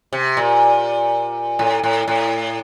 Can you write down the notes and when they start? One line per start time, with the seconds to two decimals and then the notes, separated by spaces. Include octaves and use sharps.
0.13 C3
0.37 A#2
1.59 A2
1.83 A2
2.08 A2